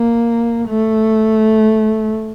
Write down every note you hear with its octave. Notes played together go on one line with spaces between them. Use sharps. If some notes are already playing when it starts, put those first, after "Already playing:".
Already playing: A#3
A3